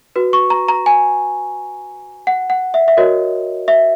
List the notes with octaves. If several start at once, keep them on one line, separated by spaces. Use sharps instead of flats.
F#4 B4
C#6
A#5
A#5
G#5
F#5
F#5
E5
E5
F#4 A#4 C#5 D#5
E5